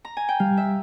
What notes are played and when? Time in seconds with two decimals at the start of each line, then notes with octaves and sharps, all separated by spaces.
0.05 A#5
0.17 G#5
0.28 G5
0.39 G3 F5
0.57 E5